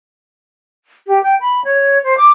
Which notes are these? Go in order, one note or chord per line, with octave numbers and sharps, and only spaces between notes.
G4
G5
B5
C#5
C5
D6